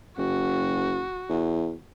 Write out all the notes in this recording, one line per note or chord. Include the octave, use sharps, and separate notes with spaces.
F#1 F#4
E2